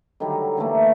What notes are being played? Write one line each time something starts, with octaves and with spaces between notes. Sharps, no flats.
D3 D#3 F#3 G3
D3 E3 A3 A#3